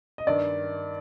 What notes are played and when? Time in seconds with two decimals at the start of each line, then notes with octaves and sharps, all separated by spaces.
0.18 D#5
0.27 G2 D#3 D5